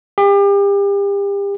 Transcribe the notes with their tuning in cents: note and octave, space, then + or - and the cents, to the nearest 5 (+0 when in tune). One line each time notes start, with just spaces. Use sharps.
G4 +35